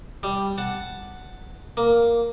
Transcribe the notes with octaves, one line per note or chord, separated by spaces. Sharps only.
G3
F#5 A5
A#3